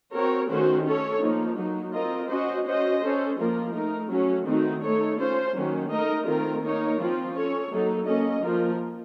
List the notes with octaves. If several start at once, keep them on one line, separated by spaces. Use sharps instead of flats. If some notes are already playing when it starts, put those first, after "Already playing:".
C4 F#4 A#4 C#5
D#3 A3 C#4 F#4 C5
C#4 A4 C#5
F3 A#3 D#4
F#3 A#3 D#4
C4 F4 A#4 D#5
C#4 F#4 C5 D#5
C#4 F#4 C5 D#5
C#4 A4 C5
F3 A#3 F4 A#4
A3 D#4 A#4
F#3 A3 C#4 F#4
D#3 A3 C4 D#4 F#4
A3 D#4 A4 C#5
C#4 F4 C5
D#3 F#3 A#3 C#4
A3 D#4 A#4 D#5
D#3 A3 C4 F4 A#4
A#3 D#4 A#4 C#5
F3 C4 F4
C#4 A4 C#5
F#3 A#3 D#4 A4
A#3 C#4 A4 D#5
F3 A#3 F4 A#4